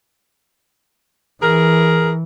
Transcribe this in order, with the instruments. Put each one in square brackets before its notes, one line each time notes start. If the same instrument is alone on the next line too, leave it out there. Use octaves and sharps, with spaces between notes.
[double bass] E3 [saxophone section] G#4 A#4